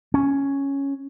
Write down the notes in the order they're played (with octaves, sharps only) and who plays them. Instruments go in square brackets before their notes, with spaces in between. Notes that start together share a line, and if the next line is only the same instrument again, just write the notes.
[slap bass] C#4